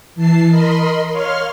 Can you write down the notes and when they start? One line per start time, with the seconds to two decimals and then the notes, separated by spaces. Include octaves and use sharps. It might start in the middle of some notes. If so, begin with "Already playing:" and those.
0.15 E3 A5 C7
0.48 A#4 D#5 B5 C6
1.11 C#5 F5 C6 F6